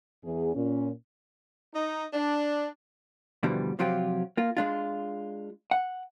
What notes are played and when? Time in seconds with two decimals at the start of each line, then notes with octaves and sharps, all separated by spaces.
0.23 E2 G#4
0.55 A#2 C#4
1.74 D#4
2.13 D4
3.43 G2 B2 D3 E3 F3 G3
3.79 C3 F3 F#3 F4 G4
4.37 A#3 F4
4.57 G#3 D4 F4
5.71 F#5